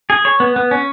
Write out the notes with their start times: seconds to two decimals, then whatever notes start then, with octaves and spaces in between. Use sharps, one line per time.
0.10 G#4
0.25 C#5
0.40 B3
0.56 B3
0.71 C#4